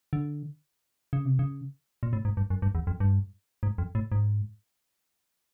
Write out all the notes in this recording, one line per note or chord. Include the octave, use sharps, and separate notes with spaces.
D3
C#3
C3
C#3
A#2
A2
G#2
G2
F#2
G2
E2
F2
G2
G#2
F2
A2
G#2